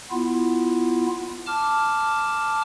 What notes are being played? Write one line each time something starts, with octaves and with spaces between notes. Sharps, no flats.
B3 E4 F4
A5 D6 F6